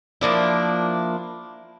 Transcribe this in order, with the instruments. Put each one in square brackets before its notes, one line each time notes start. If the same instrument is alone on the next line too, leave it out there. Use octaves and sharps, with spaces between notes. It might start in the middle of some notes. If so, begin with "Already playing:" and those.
[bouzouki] F3 A#3 D4 E4